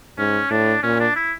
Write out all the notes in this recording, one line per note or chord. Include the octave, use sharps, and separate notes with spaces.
G#2 C#4
A2 D4
A#2 C#4
D4
E4